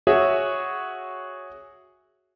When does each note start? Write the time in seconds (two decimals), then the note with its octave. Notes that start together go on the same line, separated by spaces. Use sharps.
0.07 F#4 G#4 C#5 E5